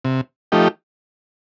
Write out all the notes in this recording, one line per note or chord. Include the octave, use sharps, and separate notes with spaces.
C3
F3 A3 D#4 G4